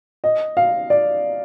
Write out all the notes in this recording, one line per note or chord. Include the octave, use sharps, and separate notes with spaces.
D#5
F5
D5